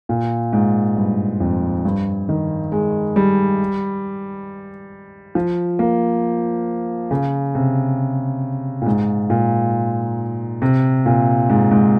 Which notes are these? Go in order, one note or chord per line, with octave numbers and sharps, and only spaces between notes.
A#2
G#2
G2
F2
G2
D#3
G#3
G3
F3
A#3
C#3
C3
A#2
G#2
A#2
C3
A#2
G#2
G#2